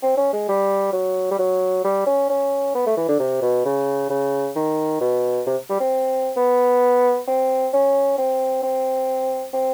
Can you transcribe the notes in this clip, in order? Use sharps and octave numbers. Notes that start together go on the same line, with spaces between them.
C4
C#4
G#3
G3
F#3
G3
F#3
G3
C#4
C#4
B3
A3
E3
D3
C3
B2
C#3
C#3
D#3
B2
C3
G3
C4
B3
C4
C#4
C4
C4
C4